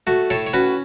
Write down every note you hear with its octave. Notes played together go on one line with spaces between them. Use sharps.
A3 F#4
A2 A4 C#5
C#5
C#4 F#4 B4